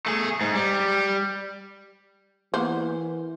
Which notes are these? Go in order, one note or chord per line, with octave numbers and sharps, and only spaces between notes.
A3 G#4
G#2
G3
E3 A#3 B3 C5